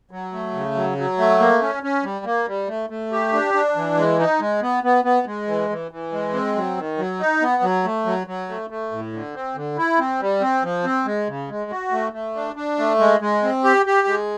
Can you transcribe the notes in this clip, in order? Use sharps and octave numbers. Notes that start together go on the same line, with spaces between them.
F#3
A3
C#3
F#3
F#3
A3
A#3
C#4
C#4
G3
A#3
G3
A3
A3
G4
D4
D4
E3
G#3
D#4
G#3
B3
B3
B3
G#3
E3
E3
E3
G#3
C4
F#3
D#3
F#3
D#4
B3
F#3
A3
F#3
F#3
A3
A3
A2
D3
C4
D3
E4
C4
G3
C4
F3
C4
G#3
C#3
G#3
F#4
A3
A3
D4
D4
A3
G#3
G#3
C4
G4
G4
G#3